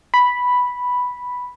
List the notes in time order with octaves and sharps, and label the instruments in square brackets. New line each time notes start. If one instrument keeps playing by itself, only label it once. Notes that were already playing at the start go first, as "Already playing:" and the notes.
[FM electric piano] B5